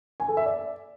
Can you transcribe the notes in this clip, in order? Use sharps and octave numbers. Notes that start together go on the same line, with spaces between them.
G#5
A4
E5
D5